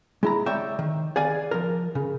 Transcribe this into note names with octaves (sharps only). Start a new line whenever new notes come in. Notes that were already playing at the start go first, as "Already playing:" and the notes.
G#3 E4 A#5
C#5 D5 E5 G5
D#3
G#4 D5 F5 G#5
F3 A#4
C#3